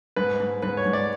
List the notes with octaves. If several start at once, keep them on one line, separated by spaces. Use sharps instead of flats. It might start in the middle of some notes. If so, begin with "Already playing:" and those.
G#2 B4
G#2
G#2 B4
C#5
G#2
D5